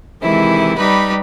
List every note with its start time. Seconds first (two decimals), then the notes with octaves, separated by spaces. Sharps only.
0.21 C3 D#3 E3 G#3 E4
0.77 G3 D#4 G4 B4 B5